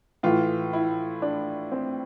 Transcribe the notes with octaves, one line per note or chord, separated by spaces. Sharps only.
A2 E3 F4
E4
D4
C4